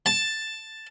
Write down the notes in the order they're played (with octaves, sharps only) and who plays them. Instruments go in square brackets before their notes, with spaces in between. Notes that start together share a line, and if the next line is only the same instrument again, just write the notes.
[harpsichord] A5